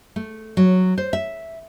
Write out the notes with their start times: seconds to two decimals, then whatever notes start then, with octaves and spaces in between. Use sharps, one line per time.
0.16 A3
0.57 F#3
0.98 C5
1.13 E5